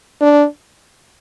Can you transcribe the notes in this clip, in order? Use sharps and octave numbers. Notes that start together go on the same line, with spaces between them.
D4